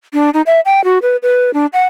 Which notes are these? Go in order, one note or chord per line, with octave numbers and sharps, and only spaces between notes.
D4
D#4
E5
G5
F#4
B4
B4
D4
F#5